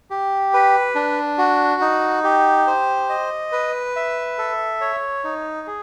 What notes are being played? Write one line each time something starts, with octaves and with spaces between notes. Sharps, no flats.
G4
B4
D4
F#4
D#4
G4
C5
D#5
B4
E5
A4
C#5
D#4
G#4